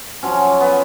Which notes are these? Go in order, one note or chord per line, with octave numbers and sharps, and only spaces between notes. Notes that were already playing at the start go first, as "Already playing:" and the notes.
F3 F#3 C#4
B3